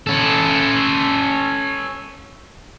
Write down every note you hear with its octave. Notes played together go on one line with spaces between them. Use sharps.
C#4 A4